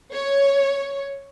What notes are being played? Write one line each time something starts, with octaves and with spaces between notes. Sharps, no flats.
C#5